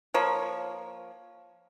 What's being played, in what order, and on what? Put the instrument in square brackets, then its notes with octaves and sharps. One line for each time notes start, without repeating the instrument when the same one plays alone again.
[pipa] F3 A#3 C#5